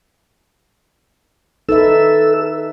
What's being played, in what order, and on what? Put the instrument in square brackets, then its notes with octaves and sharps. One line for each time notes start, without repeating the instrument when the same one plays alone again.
[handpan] D#4 B4 E5 [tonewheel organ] A4 E6